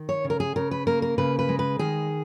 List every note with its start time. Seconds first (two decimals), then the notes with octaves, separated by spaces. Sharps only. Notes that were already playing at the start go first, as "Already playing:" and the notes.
Already playing: D#3
0.09 C#5
0.24 C#3
0.30 A#4
0.40 G#4
0.56 C#3 A#4
0.71 B4
0.87 A#3 A#4
1.02 A#4
1.18 C#3 B4
1.39 B4
1.49 G#3
1.59 B4
1.79 D#3 G#4